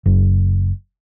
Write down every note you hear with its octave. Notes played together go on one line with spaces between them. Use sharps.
F#1